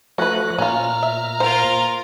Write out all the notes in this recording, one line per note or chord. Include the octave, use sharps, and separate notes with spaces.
F3 A3 C#4 F#4 B4 F#6
A#2 C#4 F4 A#5 F6
E5
F4 A#4 C5